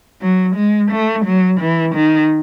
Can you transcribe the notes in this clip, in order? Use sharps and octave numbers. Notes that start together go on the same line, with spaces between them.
F#3
G#3
A3
F#3
E3
D#3